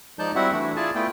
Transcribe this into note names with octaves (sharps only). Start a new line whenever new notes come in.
F3 G#3 D#4 D5 A5 G6
G3 C4 E4 F#4 E5 F#5
E3 A3 D4 E4 F#4
E4 F4 G#4 D5 G#5 A5
A3 B3 E4 F4 G5